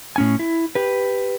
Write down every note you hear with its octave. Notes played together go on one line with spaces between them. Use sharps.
A2 C#4 G#5
E4
G4 B4